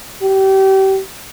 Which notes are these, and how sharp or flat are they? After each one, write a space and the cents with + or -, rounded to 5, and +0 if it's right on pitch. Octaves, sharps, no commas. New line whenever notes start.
G4 -30